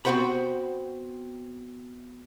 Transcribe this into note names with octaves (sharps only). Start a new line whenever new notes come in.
B3 C4 F#4 C5 F#5 B5